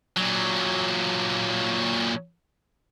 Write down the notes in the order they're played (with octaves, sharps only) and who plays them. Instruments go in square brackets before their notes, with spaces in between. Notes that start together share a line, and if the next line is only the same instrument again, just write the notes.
[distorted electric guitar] A#2 F#3